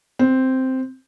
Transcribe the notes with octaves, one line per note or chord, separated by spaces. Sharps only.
C4